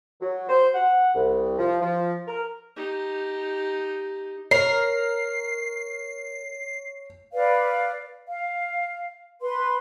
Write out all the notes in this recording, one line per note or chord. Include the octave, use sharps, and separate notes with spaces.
F#3
C5
F#5
C2
F3
F3
A#4
D#4 G4
A#4 C#5 C7
B4 D5 F5
F5
B4 C6